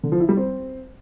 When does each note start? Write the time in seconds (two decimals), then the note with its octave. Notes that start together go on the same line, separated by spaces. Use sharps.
0.03 D3
0.12 F3
0.20 E4
0.29 G3
0.37 C4